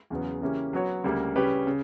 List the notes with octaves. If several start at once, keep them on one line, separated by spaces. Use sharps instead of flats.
E2 C#3 F#3 B3
C#3 E3 A#3 C#4 G4
F#3 B3 F#4 C#5
D2 C#3 G3 A#3
C#3 G3 C#4 G4 B4
C#3